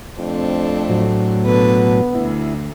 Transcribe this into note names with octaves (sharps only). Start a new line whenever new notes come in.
F2 A3 C4 D4
A2 F#3
B2 D3 B3 B4
D2 E4